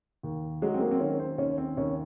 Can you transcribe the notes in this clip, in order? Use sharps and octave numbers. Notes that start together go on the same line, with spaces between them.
D#2
F#3 G#3
C4
A#3
C4
D#3 C#4
C5
D#2 C#4
C4
D#2 C#4